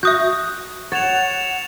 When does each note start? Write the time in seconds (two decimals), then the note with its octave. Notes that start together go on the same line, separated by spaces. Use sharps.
0.03 F#4 E5 D#6 G6
0.92 C#5 F#5 A6 E7 F7